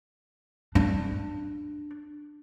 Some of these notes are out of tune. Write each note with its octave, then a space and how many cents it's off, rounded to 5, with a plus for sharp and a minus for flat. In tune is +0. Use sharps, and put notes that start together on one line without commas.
D4 +15